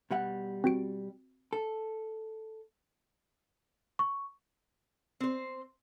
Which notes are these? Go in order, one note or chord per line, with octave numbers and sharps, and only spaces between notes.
B2 G3 F#5
C4 F#4 D7
A4
C#6
C4 C5